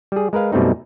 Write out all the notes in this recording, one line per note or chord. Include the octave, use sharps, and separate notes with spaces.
G3 G#4
G#3 A#4 B4 F5
F#2 B2 G3 A3 C4 D#4